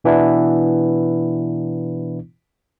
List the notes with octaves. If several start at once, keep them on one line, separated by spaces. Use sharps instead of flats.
B2 E3 B3 D4 E4